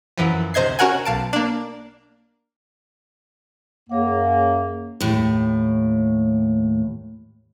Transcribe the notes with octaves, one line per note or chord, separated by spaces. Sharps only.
F#2 E3 F3
D2 C3 C5 D#5 G#6 C7
C#4 F#4 A#4 F#5 G#5
B1 F5 A5 D7
A#3 D4
F#2 A#3 G#4 C#5 F#5
D#2 A2